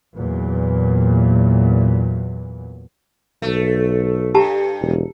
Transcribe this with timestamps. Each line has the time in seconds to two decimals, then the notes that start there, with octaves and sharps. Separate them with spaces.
0.15 E2 A#2 F#3
3.42 B1 A3
4.35 G2 G4 A5 A#5
4.81 E1